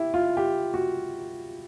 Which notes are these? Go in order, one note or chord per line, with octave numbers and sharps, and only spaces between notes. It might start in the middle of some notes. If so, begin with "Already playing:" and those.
Already playing: E4 G4
F4
G4
F#4